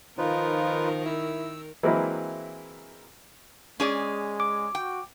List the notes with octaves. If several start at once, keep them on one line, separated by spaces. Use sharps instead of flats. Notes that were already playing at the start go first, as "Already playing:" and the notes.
D#3 F3 D#4 F4 A#4 B4
E4 E6
E3 F#3 G#3 A#3 C4 E4
G#3 C#4 G#4 D5
D6
F#4 G5